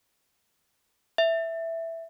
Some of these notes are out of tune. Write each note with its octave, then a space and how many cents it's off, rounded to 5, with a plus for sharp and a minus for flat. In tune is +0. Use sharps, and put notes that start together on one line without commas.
E5 +0